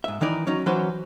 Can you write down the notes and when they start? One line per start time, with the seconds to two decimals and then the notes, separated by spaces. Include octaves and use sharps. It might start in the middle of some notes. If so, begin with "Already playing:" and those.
0.04 G#2 E5
0.21 D#3 E3 D#4 D5
0.47 F#3 C#4 D#4
0.66 E3 F#3 C#4 F#4 B4 C5